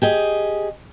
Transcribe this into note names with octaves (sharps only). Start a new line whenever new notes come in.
G4 G#4 D#5